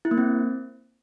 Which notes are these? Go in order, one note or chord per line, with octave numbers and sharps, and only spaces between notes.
E4
A#3
C4